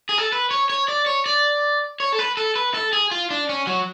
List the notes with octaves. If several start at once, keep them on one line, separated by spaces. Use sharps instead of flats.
G#4
A4
B4
C#5
C#5
D5
C#5
D5
C#5
A4
B4
A4
B4
A4
G#4
F4
D4
C#4
F#3